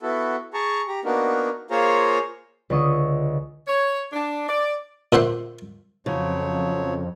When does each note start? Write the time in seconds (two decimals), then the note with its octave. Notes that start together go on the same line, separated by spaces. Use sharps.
0.01 B3 E4 F#4 A4
0.54 G#4 A5 A#5 C#6
0.87 G4 A#5
1.05 A#3 B3 D4 D#4 F#4 A#4
1.71 A#3 F4 G#4 C5 C#5 A#5
2.70 C#2 D3 C#6 D#6
3.67 C#5
4.13 D4
4.47 D5
5.12 A#2 C5 E5 F#5 C6
6.06 F2 C#3 F3 F#3 C#5